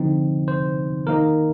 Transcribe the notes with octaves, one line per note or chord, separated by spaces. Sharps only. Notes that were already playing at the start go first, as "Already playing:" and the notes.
Already playing: D3 F3 C4 D#4
C5
D#3 A#3 D#4 A#4